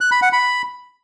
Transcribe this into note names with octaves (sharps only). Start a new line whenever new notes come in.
F#6
B5
F#5
B5